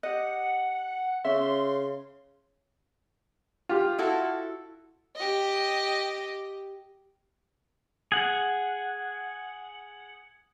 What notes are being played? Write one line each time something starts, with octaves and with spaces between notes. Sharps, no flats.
G4 D#5 F#5
C#3 C#4 E5 C6
F4 G4
E4 F#4 A4
G4 D#5
G#4 F#5